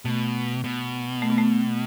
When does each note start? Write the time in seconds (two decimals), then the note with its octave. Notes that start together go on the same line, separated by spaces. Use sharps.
0.05 B2 A3
0.64 B2 B3
1.22 A3
1.30 B3
1.38 A3